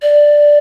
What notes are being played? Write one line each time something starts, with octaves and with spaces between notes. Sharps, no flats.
D5